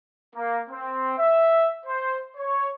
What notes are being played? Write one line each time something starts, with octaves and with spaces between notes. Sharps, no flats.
A#3
C4
E5
C5
C#5